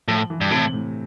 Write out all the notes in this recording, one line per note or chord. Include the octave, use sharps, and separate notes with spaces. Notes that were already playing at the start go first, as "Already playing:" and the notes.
A2 F3
E3
G2
A2 C3
A2